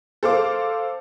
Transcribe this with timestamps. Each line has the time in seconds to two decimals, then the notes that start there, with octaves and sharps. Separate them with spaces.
0.23 A4 C5 F5 D6